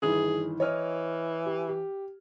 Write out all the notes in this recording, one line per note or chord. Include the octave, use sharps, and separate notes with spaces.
G1 D#3 E3 G#4
E3 C#5 D#5 F6
G4
G4